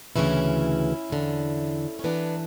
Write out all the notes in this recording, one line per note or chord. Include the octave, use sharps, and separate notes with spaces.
D2 C#3 E3 C#4 E4
E2 D3
C#4
G2 E3 B3 D4